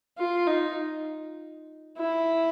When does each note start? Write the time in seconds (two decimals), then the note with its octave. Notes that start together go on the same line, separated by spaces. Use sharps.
0.18 F4
0.47 D#4
1.97 E4